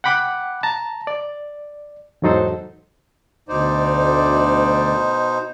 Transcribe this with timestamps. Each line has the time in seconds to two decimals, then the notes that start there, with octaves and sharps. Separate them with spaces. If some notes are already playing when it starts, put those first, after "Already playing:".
0.04 F#5 G5 B5 D6 F#6
0.63 A5 A#5
1.07 D5
2.22 E2 G#2 F#3 D#4 A4 C5
3.49 D2 B2 D#4 C5 D5